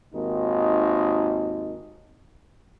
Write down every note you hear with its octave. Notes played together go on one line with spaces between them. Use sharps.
G#1 D#2 D#4